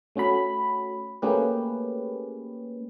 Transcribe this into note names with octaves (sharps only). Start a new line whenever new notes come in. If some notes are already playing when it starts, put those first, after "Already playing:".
A3 C#4 F#4 B5
A3 A#3 C#4 G4 G#4 B4